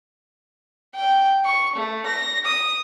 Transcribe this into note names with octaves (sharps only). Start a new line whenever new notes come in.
G5
C#6
A3
A#6
D#6